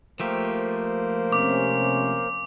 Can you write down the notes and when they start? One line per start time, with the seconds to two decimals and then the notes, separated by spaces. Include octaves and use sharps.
0.20 F3 A3 A#3 G4 A#4 C5
1.32 C3 C#4 D6